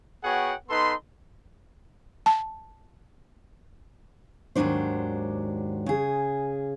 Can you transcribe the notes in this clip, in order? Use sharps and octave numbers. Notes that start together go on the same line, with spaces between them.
B3 F#4 G#4 C#5 F#5 G5
B3 D#4 A4 B4 C6
A5
D#2 G#2 B2 F#3 D4 C5
C#3 G#4